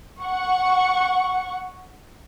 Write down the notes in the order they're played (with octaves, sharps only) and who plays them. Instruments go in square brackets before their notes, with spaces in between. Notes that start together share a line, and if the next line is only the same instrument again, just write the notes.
[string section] F#5 C#6